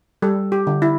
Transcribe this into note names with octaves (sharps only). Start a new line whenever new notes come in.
G3 A4
G4
D3
E4